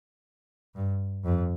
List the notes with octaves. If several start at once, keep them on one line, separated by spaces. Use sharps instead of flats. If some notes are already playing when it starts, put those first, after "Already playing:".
G2
F2